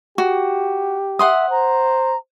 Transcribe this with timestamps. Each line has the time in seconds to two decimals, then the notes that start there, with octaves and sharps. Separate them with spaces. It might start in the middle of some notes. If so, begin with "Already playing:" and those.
0.18 F#4 G4
1.19 E5 F#5 C6 D#6
1.50 C5 A#5